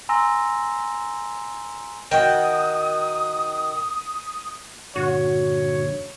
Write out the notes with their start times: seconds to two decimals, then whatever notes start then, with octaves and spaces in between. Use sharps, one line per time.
0.09 G#5 A#5 C6 E6 A#6
2.11 D#3 F#4 G5 D#6
4.96 G2 A#2 D3 F#4 C#5